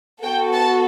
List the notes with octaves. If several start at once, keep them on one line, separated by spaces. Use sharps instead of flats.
B3 F#4 A4 G5
A5